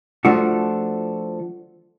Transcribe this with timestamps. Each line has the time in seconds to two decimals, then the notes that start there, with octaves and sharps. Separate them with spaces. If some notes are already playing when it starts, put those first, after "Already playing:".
0.25 F3 A3 D4 F#4